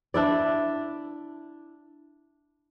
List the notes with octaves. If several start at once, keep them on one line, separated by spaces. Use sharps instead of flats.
D4 E4 D5